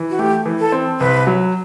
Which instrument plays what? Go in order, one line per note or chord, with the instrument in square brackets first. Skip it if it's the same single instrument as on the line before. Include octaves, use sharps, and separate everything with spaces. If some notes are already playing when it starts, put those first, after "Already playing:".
Already playing: [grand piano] E3
[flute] F#4
[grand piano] A3 [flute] G4
[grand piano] E3
[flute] A4
[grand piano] C4
[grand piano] C2 [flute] B4
[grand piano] F#3